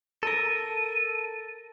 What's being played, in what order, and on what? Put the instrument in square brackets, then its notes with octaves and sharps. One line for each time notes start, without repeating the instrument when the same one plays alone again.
[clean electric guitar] A4 A#4 [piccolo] D#7